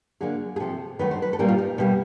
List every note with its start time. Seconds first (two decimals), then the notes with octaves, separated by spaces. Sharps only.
0.21 D3 F#3 A#3 G#4
0.56 G#4
0.60 C3 F3 A3 A4
0.99 D#3 F#3 A3 B4
1.11 C5
1.22 B4
1.33 A4
1.39 A#2 G3 A#3 A#4
1.48 F4
1.58 D#4
1.78 B2 G3 A#3